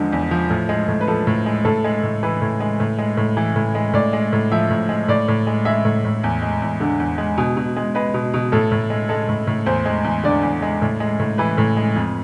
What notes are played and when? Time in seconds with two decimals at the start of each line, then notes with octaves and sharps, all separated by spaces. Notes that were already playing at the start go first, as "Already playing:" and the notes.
Already playing: E2 D3 F3 G#3
0.13 E2
0.31 F3
0.50 A2
0.69 G#3
0.88 A2
1.01 B4
1.08 F3 A4
1.27 A2
1.46 G#3
1.65 A2 A4
1.84 G#3
2.03 A2
2.23 E3 B4
2.42 A2
2.60 G#3
2.80 A2
2.98 G#3
3.17 A2
3.37 E3
3.56 A2
3.75 G#3
3.94 A2 D5
4.13 G#3
4.33 A2
4.52 F3 E5
4.70 A2
4.89 G#3
5.08 A2 D5
5.28 A2
5.47 G#3
5.65 G#3 E5
5.85 A2
6.05 A2
6.24 E2
6.42 G#3
6.62 E2
6.80 D3
7.00 E2
7.18 G#3
7.38 B2 G#5
7.57 B2
7.76 G#3
7.95 G#3 B4
8.14 B2
8.34 B2
8.52 A2 A4
8.72 A2
8.90 G#3
9.09 G#3 A4
9.29 A2
9.47 A2
9.66 E2 C5
9.85 G#3
10.05 E2
10.24 D3 D5
10.43 E2
10.62 G#3
10.82 A2
11.00 G#3
11.20 A2
11.38 E3 B4
11.58 A2
11.77 G#3
11.95 F2